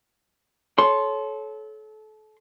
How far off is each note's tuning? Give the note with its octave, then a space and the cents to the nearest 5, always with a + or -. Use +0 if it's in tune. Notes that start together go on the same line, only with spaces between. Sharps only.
A4 -30 C#5 +0 C6 +0